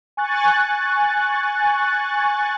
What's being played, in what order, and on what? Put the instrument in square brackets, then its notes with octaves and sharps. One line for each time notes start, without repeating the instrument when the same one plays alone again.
[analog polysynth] G#5 C#6 F#6 A6